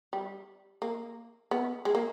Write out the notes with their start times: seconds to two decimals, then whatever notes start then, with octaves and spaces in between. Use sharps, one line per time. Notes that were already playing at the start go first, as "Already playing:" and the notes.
0.13 G3
0.82 A#3
1.51 B3
1.85 G#3
1.95 A#3